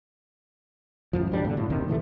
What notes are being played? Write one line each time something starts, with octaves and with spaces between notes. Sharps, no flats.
A1 F#2 F3
D2 G3 C#4 D4
G2 B2 D3
A2
D#2 C3 D#3
A2 E3 F3 A3